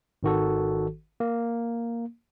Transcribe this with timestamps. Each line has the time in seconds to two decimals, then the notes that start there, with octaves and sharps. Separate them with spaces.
0.23 G#1 D#3 F#4 A4
1.20 A#3